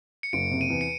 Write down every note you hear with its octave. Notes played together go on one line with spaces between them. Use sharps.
C#7
F#1 D7
C3
D#7
E2
C#7